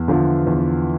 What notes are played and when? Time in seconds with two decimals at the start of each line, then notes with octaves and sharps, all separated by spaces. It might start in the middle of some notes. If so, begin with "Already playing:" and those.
Already playing: E2
0.08 D3 F3
0.47 E2